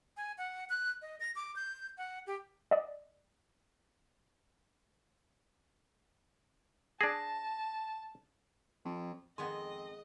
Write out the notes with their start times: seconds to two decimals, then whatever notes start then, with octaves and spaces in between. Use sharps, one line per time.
0.17 G#5
0.38 F#5
0.69 F#6
1.02 D#5
1.20 A#6
1.36 D6
1.56 G6
1.97 F#5
2.27 G4
2.71 D5 D#5
7.01 D4 G#4 A5 A#6
8.85 F2
9.38 F2 D#3 G#3 B3 C4 D#5 G#5 C6